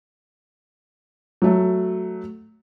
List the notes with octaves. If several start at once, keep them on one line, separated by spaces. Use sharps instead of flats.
F#3 A3